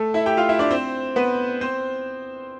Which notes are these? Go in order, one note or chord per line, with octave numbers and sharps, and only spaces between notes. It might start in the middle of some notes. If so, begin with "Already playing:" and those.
Already playing: A3 A4
E4 E5
G4 G5
F4 F5
E4 E5
D4 D5
C4 C5
B3 B4
C4 C5